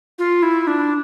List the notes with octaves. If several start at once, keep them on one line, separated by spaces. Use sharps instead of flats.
F4
E4
D4